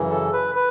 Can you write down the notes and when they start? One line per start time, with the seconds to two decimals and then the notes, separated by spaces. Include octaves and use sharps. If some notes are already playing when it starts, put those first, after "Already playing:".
Already playing: F#2 C#3 E3
0.11 A4
0.33 B4
0.55 B4